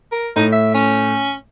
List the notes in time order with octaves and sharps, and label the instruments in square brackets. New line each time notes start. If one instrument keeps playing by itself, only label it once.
[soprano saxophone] A#4
[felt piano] A2 [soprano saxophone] D#4
[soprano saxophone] E5
C#4